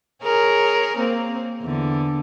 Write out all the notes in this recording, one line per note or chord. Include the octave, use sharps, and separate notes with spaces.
G#4 A#4 C#5
A#3 C4
E2 D3